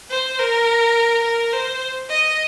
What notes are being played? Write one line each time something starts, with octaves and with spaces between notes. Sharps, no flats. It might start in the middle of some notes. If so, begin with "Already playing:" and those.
C5
A#4
A#4
C5
D#5